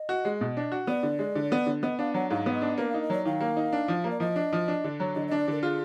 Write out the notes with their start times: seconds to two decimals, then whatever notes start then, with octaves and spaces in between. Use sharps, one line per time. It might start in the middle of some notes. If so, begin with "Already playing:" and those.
Already playing: D#5
0.09 F#4
0.25 G#3
0.41 B2
0.57 D4
0.72 F#4
0.87 B3 D5
1.03 D3
1.19 G#3
1.35 D3
1.52 B3
1.66 D3
1.83 B3 D#5
1.99 D4 F5
2.14 F#3 F#5
2.30 G#2 F5
2.46 B3
2.54 D#5
2.62 D4
2.78 A#3 B4
2.90 D#4 F5
3.02 D#5
3.10 F#3 D5
3.25 D#3 F5
3.41 A#3
3.57 D#4
3.72 D4
3.88 F3
4.04 A#3
4.11 D5
4.20 F3 D#5
4.36 D4
4.53 F3
4.68 D4
4.84 D3
5.00 F#3
5.15 D3 D#5
5.28 D4 D#5
5.39 D5
5.48 D3 A#4
5.63 F4 G#4